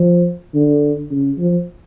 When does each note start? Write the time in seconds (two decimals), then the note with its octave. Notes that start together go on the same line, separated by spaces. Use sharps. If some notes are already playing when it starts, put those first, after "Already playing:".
Already playing: F3
0.54 D3
1.11 C#3
1.38 F3